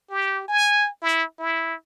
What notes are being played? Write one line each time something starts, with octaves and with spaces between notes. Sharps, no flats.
G4
G#5
E4
E4